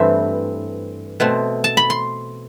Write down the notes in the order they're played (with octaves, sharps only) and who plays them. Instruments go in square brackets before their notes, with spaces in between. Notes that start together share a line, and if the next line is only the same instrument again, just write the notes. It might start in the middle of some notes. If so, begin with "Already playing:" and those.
Already playing: [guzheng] G2 E3 A3 C4 E5
B2 A3 C4
A5
B5
C6